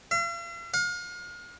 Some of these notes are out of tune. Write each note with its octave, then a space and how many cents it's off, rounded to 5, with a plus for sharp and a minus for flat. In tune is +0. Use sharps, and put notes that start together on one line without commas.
F5 -45
F5 +40